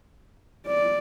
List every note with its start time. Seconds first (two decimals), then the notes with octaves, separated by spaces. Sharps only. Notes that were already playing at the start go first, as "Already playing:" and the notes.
0.67 D5